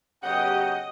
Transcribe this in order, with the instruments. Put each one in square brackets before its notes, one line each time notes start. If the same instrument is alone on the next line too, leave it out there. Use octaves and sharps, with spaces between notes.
[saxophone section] C#3 F#3 F#5 [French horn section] B3 G4 [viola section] D#5 [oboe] G5